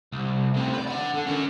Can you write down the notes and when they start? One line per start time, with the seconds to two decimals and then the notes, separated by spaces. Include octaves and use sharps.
0.12 C2
0.54 D2 C3
0.73 B4 D5
0.87 D4 F#5
1.14 D3
1.27 C#4 A#4